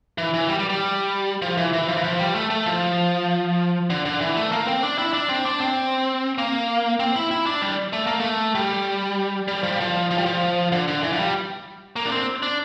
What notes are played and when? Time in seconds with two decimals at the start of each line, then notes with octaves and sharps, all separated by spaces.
0.18 E3
0.34 E3
0.49 G3
0.59 G3
0.69 G3
1.42 F3
1.57 E3
1.73 E3
1.88 F3
1.97 E3
2.04 F3
2.19 G3
2.35 A3
2.50 A3
2.66 F3
3.90 D3
4.05 D3
4.21 E3
4.36 A3
4.52 A#3
4.68 C4
4.83 D4
4.98 E4
5.13 D4
5.29 C4
5.45 D4
5.61 C4
6.38 A#3
7.00 C4
7.16 E4
7.31 E4
7.46 D4
7.62 G3
7.93 A3
8.07 A#3
8.20 A3
8.55 G3
9.48 G3
9.63 F3
9.72 G3
9.80 F3
10.11 F3
10.18 G3
10.26 F3
10.72 D3
10.88 D3
11.03 E3
11.13 F3
11.19 G3
11.96 A#3
12.06 D4
12.12 C4
12.43 D4